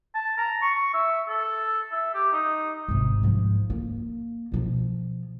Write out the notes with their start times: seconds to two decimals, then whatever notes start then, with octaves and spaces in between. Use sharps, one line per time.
0.15 A5
0.38 A#5
0.62 C#6
0.94 E5
1.29 A4
1.92 E5
2.14 G4
2.32 D#4
2.88 G#1 C3
3.23 G#2 F3
3.70 A#3
4.52 B2 F3